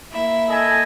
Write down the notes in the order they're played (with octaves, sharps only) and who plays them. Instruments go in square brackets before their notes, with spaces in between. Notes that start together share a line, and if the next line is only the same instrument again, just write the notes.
[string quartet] A#3 E4 E5
[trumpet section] A4 D#5 G#5